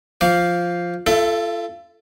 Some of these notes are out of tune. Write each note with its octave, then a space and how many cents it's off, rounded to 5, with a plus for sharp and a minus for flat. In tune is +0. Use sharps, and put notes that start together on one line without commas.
F3 +0 F5 +0 D6 -25
F4 -30 A4 +0 E5 +20